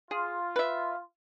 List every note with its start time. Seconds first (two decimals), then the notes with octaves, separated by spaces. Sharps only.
0.11 F4 G#4
0.56 B4 E5